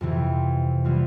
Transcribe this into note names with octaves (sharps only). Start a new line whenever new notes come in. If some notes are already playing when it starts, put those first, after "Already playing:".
F2 C3 E3
E3 G3 B3 F4